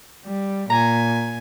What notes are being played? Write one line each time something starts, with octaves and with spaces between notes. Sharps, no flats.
G3
A#2 G#5 A#5